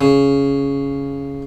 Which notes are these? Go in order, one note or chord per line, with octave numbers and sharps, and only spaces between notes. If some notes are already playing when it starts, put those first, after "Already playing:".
C#3